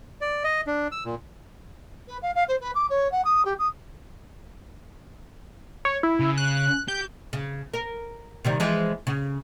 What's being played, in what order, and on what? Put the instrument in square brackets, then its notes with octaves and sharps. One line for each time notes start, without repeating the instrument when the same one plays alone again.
[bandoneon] D5
D#5
D4
E6
A#2
[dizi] B4
F5
F5
C5
B4
D6
C#5
F#5
D#6
G4
D#6
[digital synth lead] C#5
E4
[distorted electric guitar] C#3
[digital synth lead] F#6
[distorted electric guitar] G4 [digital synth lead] G6
[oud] C#3
A#4
C3 D#3 G3
E3 F3 G#3
C#3